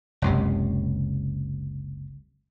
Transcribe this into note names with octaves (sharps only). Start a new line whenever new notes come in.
F#1 C#2 C3